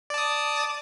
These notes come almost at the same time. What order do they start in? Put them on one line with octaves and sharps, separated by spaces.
D5 A5 D#6